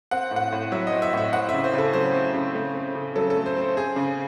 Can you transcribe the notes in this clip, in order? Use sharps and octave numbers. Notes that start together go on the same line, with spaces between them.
C4 F#5
A2
F#5
A2
F#3 E5
D#5
C4
E5
A2 E5
C4 F#5
E5
C#3
C5
C#3 A4
F#3 C5
C4
C#3
A3
C4
C#3
F#3 A4
A4
A3
C5
C4
C5
C4 G#4
C#3